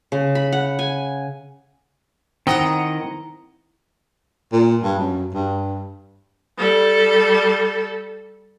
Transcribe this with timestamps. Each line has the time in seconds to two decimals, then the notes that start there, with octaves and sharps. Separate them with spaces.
0.12 C#3
0.35 B5
0.52 F#5
0.79 G#5
2.47 D#3 C4 E4 D#5 F#5 A#5
4.52 A#2
4.83 G2
4.99 F#2
5.34 G2
6.58 G3 A4